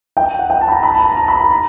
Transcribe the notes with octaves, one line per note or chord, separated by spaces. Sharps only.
G5
F#5
G5
A5
B5
A#5
B5
A5
A#5
A#5
B5
A#5
A#5